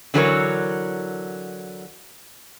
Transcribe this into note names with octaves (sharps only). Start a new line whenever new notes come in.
D3 E3 F#3 G#4 A#4 C#5